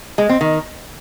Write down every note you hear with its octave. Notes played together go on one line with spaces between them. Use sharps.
G#3
C4
D#3